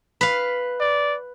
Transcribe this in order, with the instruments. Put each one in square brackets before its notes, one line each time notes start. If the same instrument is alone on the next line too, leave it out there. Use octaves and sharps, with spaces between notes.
[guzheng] B4 F5
[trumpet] D5